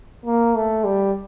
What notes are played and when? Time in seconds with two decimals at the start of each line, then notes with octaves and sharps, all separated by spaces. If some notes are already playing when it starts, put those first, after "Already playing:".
0.25 A#3
0.55 A3
0.84 G3